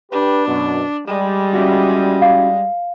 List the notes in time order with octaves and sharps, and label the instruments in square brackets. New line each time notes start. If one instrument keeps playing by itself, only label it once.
[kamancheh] D4 [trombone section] G4 B4
[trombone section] F#2 B2
[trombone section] G3 [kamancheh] G#3
[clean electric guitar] C#4 E4 F#4
[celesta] F5